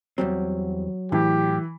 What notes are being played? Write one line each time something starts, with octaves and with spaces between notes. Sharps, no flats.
E2 F#3 G3 C4
A2 E3 G4